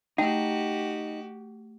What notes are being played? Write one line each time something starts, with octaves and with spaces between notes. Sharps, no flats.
A3 D#4 F#4 G4 G5